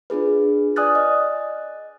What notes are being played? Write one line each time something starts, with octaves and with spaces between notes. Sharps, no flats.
D4 F4 G#4 B4
D5 G#5 D#6 F6 F#6 A6
D#5